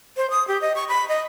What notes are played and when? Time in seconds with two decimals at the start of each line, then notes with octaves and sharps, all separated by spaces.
0.17 C5
0.30 D#6
0.48 G4
0.61 D#5
0.75 C#6
0.89 B5
1.09 D#5